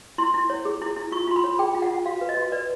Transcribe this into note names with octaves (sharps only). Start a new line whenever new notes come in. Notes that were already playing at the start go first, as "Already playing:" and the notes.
E4 C6
E4
C#5
G#4
E4
E4
F4 C#6
F4 C6
B5
C#5
G#4 G5
F4
F#5
F4
F#4 F5
B4
D#5
F#4
B4 D5